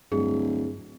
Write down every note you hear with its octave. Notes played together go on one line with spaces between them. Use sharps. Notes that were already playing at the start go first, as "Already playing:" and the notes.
D1 G2 G#4